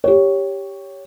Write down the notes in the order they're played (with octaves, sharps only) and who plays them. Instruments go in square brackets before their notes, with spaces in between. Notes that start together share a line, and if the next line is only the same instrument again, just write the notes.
[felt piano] G4 C#5